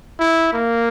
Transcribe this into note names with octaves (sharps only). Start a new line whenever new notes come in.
E4
A#3